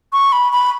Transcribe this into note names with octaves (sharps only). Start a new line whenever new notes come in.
C#6
B5
B5